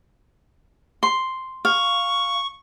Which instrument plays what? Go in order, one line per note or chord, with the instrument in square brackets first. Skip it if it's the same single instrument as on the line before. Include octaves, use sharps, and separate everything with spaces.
[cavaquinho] C6
[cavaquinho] F5 [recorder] C#6